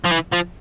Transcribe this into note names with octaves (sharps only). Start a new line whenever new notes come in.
F3
E3
F3